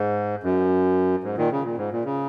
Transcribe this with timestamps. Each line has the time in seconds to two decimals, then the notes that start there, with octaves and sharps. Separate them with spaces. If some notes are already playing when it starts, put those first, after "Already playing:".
Already playing: G#2
0.43 F#2
1.23 G#2
1.37 A#2 D#3
1.51 C#3
1.64 A#2
1.77 G#2
1.92 A#2
2.05 C#3